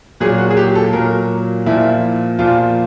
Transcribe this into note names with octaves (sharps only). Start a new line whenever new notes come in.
A#2 F#3 G#4
F#4
G#4
G4
A4
A#2 F#3 A#4
A#2 F3 E4
A#2 F3 F4